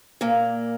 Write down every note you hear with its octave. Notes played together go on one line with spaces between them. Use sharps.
A#2 A#3